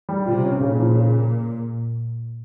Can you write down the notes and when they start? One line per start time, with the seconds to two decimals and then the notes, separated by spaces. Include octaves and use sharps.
0.09 G3
0.26 C3 F4
0.43 C#4
0.60 A#2 C#3
0.79 F3
0.96 C#3